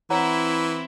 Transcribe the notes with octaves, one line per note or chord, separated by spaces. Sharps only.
E3 C4 E4 C#5 F#5 A#5